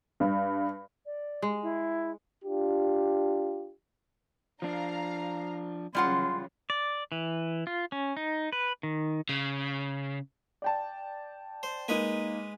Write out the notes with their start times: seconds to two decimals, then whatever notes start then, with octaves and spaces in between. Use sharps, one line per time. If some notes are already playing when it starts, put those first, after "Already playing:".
0.20 G2
1.06 D5
1.42 G#3
1.63 E4
2.43 D4 F4 G4
4.62 F3 D4 F5 A#5
5.95 C#3 E3 F#3 G3 F4 F#5 C6
6.70 D5
7.12 E3
7.67 F4
7.92 C#4
8.17 D#4
8.53 B4
8.83 D#3
9.29 C#3
10.62 D5 G5 A5
11.63 C5
11.88 G#3 A#3 D#4 B4 G#5